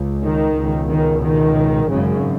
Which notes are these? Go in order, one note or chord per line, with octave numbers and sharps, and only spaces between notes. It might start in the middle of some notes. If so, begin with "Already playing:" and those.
Already playing: C#2
D#3
C#2 B2
D#3
D#3
G#1 F#2 C#3